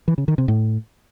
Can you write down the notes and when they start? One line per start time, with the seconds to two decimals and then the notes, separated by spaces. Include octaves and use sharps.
0.08 E3
0.18 C#3
0.28 D#3
0.38 C3
0.48 A2